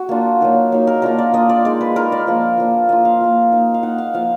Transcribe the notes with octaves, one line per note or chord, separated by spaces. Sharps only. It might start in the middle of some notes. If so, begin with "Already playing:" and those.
Already playing: F#4
A#3 D4 F4
F#3 A#3 D#4
F#3 A#3 D#4
A#4
A#3 D4 F4 A#4
D5
A#3 D4 F4 D#5
D5
G#3 D#4 D5
B4
G#3 D#4 A#4
D5
F3 A#3 D4
F3 A#3 D4
A#3 F4 D#5
F5
A#3 F4
A#3 D#4
F5
A#3 D#4 F#5
F5
F3 A#3 F4 F5